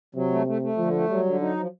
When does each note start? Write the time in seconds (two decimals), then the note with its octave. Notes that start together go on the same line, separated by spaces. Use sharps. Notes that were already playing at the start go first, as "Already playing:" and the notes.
0.15 C3 F#3
0.31 A3
0.47 A3
0.62 A3
0.78 D3 F3
0.94 A3
1.09 F#3 G3
1.25 D3
1.41 F#3 D#4
1.57 F3